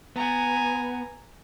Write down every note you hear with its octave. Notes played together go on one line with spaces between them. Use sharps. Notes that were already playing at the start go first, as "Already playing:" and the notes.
B3 G#5 A#5